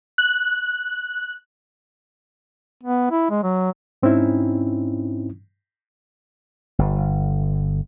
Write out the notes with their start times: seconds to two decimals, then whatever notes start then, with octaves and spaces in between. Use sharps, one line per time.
0.18 F#6
2.84 B3
3.11 E4
3.30 G#3
3.43 F#3
4.03 G#2 C4 C#4 D#4 E4
6.79 G1